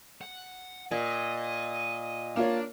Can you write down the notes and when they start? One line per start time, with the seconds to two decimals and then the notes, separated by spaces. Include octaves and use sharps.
0.21 F#5
0.91 A#2 D#5
2.36 A#3 D4 F4 C#5